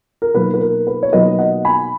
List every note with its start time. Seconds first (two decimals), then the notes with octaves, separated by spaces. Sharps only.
0.22 A#4
0.34 B2 F#3 A#3 D#4 B4
0.54 B4
0.61 A#4
0.87 B4
1.03 C#5
1.13 B2 F#3 A#3 D#4 B4 D#5
1.38 D#5 F#5
1.65 G#5 B5